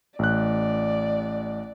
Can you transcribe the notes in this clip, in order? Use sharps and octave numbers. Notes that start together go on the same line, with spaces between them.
A1 D5 F#6